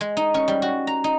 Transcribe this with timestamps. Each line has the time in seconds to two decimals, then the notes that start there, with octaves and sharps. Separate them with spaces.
0.01 G#3
0.17 D#4
0.34 C#4
0.48 G3
0.62 F#4
0.87 A#5
1.04 D#4